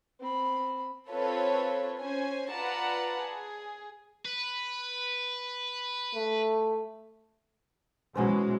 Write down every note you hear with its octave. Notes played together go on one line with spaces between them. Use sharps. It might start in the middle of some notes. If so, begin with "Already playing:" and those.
C4 B5
C4 F4 A4 B4 C#5
C#4 C5 G#5
F4 B4 D5 F#5 A5 A#5
G#4
B4
A3
B2 E3 F#3 G#3 C#4 C5